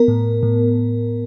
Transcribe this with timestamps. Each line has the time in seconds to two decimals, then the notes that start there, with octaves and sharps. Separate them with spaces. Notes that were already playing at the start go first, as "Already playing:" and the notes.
Already playing: B3 A#4
0.08 A2
0.43 A2